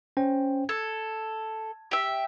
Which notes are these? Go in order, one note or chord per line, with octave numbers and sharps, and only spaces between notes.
C#4 C5 G5
A4 G#6
G4 E5